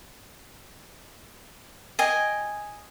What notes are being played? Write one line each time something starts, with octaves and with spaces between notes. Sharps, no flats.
D#5 G5 G#5